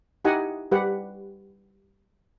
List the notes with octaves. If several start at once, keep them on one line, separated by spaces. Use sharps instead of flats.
D#4 E4 G4 D#5 F#5 G#5
G3 G4 B4 F#5